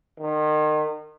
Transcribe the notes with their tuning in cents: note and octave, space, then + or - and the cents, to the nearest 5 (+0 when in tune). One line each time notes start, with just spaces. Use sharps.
D#3 -30